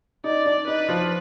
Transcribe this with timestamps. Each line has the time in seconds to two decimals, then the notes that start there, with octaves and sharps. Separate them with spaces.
0.24 D#4 D5
0.46 D4
0.68 D#4 B4
0.89 F3 F4